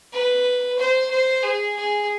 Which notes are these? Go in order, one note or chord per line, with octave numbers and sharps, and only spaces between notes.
B4
C5
C5
G#4
G#4